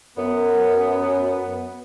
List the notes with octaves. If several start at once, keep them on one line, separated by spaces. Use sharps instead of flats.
F#2 B3